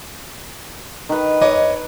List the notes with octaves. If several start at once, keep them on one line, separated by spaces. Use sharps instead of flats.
D#3 B4
F2 C#5 D#5 D6